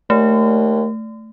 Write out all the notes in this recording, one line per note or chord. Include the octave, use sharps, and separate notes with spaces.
D#2 A3